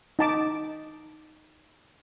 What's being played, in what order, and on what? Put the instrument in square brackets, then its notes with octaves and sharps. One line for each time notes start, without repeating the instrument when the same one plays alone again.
[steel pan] D#4 A5 D6